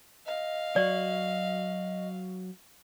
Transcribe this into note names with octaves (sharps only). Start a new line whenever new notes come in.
D#5 F5
F#3 F#4 D5